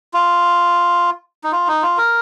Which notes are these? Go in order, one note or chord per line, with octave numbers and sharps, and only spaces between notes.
F4
D#4
F4
D#4
F4
A#4